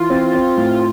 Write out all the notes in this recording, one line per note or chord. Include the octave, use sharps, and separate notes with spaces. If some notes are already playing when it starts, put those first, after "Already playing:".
Already playing: E3 F4
C4
C4
A2